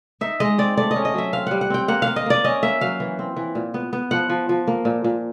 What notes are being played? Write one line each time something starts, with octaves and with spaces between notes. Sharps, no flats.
D#4 E5
G#3 D#5
C4 D5
A3 D5
D#5
C#4
D#5
F#3 E5
C4 F5
G3 F#5
F#5
C4 G5
A#3 F#5
F5
A#3
D#5
A#3 D5
C#4 D#5
A#3 E5
F#3 F5
E3
C4
E3
A#2
B3
B3
F3 F#5
F3
F3
A#3
A#2
A#2